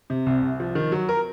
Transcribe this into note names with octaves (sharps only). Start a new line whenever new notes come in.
C3
C2
C2
F3
D#3
F#3
A#4